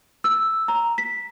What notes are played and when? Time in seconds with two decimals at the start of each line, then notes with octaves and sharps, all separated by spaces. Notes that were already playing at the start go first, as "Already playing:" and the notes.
0.24 E6
0.68 A#5
0.98 B6